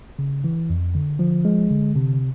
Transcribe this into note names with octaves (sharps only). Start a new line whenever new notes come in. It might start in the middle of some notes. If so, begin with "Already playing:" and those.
C#3
E3
F2
D3
F3
G#3
D3
C3